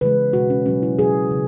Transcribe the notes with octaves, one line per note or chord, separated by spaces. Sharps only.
C#3 E3 G#3 B4
B2 G#3 F#4
C#4
B2 F#3 C#4
E4
B2 F#3 G#4
C#3